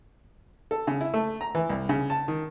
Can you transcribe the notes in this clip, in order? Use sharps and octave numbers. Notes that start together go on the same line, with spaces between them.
A4
C#3
E4
A3
A#5
E3
C2
C#3
A5
D#3